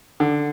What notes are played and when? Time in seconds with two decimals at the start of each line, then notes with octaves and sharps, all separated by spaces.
0.20 D3